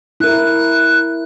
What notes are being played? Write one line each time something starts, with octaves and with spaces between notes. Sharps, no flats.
E4 A#4 F#6